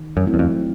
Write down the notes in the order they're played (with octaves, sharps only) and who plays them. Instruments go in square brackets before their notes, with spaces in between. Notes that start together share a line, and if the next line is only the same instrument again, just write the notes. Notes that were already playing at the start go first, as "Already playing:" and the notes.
Already playing: [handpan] D#3
[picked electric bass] F#2
[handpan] F#3 A3 C4 E4
[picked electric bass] E2
F2